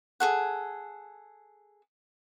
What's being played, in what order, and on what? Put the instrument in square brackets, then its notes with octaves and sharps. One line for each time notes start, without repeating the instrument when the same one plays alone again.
[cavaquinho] G#4 A4 F#5